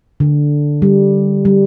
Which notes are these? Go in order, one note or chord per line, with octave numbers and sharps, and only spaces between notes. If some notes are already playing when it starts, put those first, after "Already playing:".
D3
G3
G3